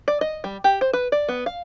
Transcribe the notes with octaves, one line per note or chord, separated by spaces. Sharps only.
D5
D#5
G3
G4
C5
B4
D5
B3
F5